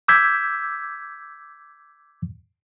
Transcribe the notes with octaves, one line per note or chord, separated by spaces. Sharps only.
D6 E6 G6 G#6 B6